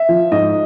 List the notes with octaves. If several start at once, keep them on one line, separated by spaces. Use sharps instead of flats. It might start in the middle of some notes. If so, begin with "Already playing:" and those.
Already playing: E5
F3
G#2 D#5